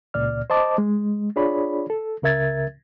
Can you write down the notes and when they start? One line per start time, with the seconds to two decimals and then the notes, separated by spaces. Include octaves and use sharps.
0.14 C#2 A#2 D5 F6
0.50 C5 D#5 A5 D6
0.78 G#3
1.36 D4 F4 G#4 C#5 D5 B5
1.90 A4
2.23 C#2 C#3 A#4 E5 G#6 A6